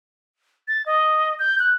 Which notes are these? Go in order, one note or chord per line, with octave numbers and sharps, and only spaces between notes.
A6
D#5
G6
F#6